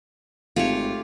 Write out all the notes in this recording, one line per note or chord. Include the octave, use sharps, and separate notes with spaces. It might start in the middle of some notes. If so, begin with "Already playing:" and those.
G#1 A3 F4 G4 C#5